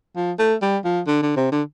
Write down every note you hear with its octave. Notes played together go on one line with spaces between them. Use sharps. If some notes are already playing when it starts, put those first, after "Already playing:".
F3
A3
G3
F3
D3
D3
C3
D3